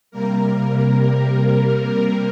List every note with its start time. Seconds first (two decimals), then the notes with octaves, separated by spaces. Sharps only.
0.11 C3 G3 A#3 A#4
1.16 A#4